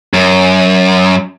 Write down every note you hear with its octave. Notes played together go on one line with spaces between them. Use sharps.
F#2